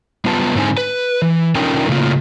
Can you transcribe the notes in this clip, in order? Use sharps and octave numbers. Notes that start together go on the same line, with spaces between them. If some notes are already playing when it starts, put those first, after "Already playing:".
G3 B3 F4 B4 A5
G#2 D3 C4 D#4 G#5
B4
E3
D3 C#4 D#4 F4 A#4 G5
A2 C#3 A#3 F4